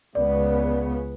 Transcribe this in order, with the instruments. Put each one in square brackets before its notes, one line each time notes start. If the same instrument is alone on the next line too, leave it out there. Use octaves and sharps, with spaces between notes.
[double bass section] C#2 C#3 B3 [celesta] D5